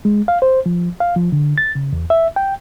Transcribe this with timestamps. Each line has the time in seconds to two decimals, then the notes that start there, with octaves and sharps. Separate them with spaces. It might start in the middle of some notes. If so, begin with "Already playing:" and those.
0.05 G#3
0.28 F5
0.42 C5
0.66 F3
1.00 F5
1.16 F3
1.32 D3
1.58 A6
1.75 C#3
1.93 E2
2.10 E5
2.36 G5